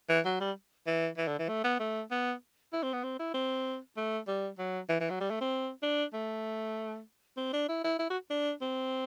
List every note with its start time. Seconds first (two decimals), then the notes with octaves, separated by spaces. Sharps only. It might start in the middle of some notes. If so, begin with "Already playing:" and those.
0.09 E3
0.25 F#3
0.40 G3
0.87 E3
1.18 E3
1.28 D3
1.39 E3
1.49 A3
1.64 B3
1.80 A3
2.11 B3
2.73 E4
2.83 C4
2.93 B3
3.04 C4
3.19 E4
3.34 C4
3.97 A3
4.28 G3
4.58 F#3
4.89 E3
5.00 E3
5.10 F#3
5.21 G3
5.31 A3
5.41 C4
5.83 D4
6.13 A3
7.37 C4
7.53 D4
7.69 E4
7.84 E4
7.99 E4
8.10 F#4
8.30 D4
8.61 C4